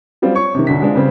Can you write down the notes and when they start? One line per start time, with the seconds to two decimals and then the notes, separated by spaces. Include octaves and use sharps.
0.22 F#3 G3 C4 F4
0.35 C#5 C#6
0.55 C3 D#3
0.67 B1 D3 B6
0.82 G#3 C4 D4 F4
0.95 C#3 G3 C4